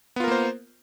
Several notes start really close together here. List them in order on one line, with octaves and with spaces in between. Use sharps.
B3 F4 A#4 A#3 C5